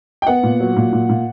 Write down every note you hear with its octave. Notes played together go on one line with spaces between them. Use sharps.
G5
B3 F#5
A#2
F#3
A#2
A#2
A#2